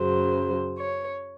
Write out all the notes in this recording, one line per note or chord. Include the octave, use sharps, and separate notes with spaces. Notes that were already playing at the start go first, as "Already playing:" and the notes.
Already playing: F#2 C#3 F#3 C5
C#5